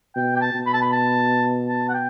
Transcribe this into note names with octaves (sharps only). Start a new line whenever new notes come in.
B2 G5
G5
A5
B2
B5
A5
B5
A5
A5
F#5
G5